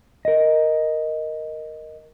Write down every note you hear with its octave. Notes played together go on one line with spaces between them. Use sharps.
A#4 D#5